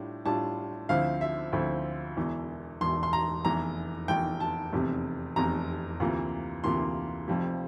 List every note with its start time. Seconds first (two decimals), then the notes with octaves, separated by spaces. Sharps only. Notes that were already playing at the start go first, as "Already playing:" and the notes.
Already playing: A2 G3 D4 F4
0.26 A2 G3 D4 F4 A5
0.89 D2 D3 F3 C4 E4 F5
1.21 E5
1.53 D2 D3 F3 C4 E4
2.17 E1 E2 E3
2.81 E1 E2 E3 C6
3.03 C6
3.13 A#5
3.45 F1 E2 E3 A#5
4.08 F1 E2 E3 G5
4.40 A5
4.72 F1 E2 C3
5.36 F1 E2 C3 A#5
6.00 D2 C3 E3 A#3 F4
6.64 D2 C3 E3 A#3 F4 C6
7.28 F1 F2 C3 F3